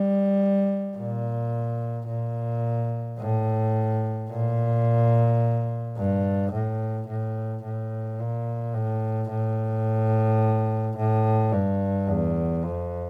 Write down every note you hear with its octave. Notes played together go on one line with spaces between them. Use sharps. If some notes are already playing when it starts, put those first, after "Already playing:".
Already playing: G3
A#2
A#2
A2
A#2
G2
A2
A2
A2
A#2
A2
A2
A2
G2
E2
F2